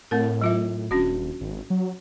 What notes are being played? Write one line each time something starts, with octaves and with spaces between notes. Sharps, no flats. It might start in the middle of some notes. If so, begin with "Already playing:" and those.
A2 A3 C4 A#4
F#3 F4 E5
D#1 C#4 D4 F#4
G#1
F#3